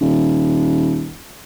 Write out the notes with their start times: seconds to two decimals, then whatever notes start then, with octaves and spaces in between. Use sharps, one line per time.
0.01 D#1